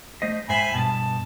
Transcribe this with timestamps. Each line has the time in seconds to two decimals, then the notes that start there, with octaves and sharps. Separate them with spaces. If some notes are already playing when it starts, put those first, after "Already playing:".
0.22 A3 C5 D#5
0.49 G#2 C5 E5 G5 G#5 B5
0.74 G2 B2 B3 A5